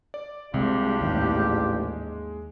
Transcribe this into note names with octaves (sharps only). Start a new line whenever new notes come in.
D5
C2 C3 G#3 D4 F4 G4
A1 D#2 G#2
G#3